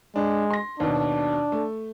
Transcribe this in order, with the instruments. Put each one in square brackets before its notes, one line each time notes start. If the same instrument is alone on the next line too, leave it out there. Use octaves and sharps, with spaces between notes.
[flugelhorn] G#3 [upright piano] D4
[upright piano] C6 A#6
[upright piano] D#2 B2 [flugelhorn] D4
[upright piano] A3